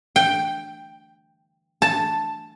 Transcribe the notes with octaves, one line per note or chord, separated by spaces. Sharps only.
G5
A5